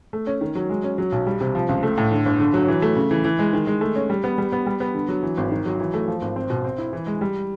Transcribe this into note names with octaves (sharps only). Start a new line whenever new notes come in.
A3
C#4
D#3
F#3
G#3
C#4
F#3
B1
G3
C3
F3
C#2
A3
A2
D3
G1
D3
F#3
E3
A3
C#3
E3
E3
G#3
D#3
G#3
A3
C#4
G3
B3
G3
B3
G3
B3
D3
F#3
E3
G#1
D#3
F#3
E3
A3
F3
G#1
C4
B2
C4
E4
E3
G#3
G3